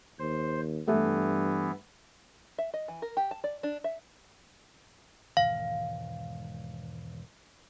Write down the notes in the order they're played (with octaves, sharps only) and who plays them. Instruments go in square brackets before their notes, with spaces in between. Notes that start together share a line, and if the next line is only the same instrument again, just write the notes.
[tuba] D#2 [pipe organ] C5
[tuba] G2 [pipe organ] E3 B3 [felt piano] A3
[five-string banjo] E5
D#5
E3
A#4
G4
A5
D5
D4
E5
[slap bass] E1 G#2 D#3 [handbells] F5